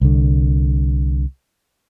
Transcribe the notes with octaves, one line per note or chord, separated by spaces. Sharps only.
C2 D3